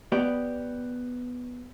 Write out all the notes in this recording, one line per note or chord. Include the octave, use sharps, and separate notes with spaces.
B3 G4 D5